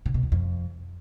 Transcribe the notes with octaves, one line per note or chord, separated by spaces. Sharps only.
C#3
B2
E2
F2